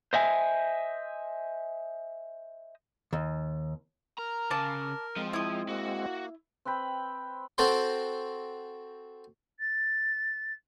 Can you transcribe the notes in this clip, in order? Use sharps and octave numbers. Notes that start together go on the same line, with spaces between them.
C5 D#5 E5 G#5
D#2
A#4 A#5
C#3 A5 D6
F3 G#3 C4
E4 D#6
A#3 F#4
C4 B4 G5 B5
C4 F#4 A4 C5 G5 C6
A6